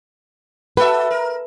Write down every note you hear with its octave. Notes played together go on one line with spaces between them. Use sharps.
F#4 A4 B4 E5
A#4